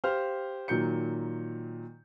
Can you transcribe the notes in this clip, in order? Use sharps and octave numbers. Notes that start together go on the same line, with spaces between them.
G4 C5 F5 F6
A#2 D#3 F#3 G6 C#7